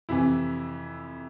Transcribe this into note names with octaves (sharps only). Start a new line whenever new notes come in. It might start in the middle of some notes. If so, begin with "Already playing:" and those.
F2 C3 E3 E4